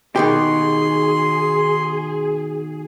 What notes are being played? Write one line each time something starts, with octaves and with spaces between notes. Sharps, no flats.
B2 D#3 G4 G#4 C6